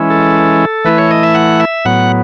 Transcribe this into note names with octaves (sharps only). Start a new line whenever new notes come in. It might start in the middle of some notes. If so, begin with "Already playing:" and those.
Already playing: E3 G#3 C#4 E4
A4
E3 A3 E4 B4
C#5
D#5
E5
F#5
E5
A2 F#3 B3 F#5